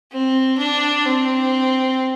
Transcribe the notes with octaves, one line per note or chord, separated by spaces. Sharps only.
C4
D4
C4